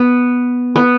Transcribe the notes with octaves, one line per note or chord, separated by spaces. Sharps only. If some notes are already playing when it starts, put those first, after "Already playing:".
Already playing: B3
B3